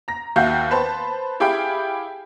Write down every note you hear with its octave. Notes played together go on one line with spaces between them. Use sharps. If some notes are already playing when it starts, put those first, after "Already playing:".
A#5 A#6
D#2 F#4 E5 F5 G6
B4 C5 A5 B5
E4 G4 G#4 F5 G5 B5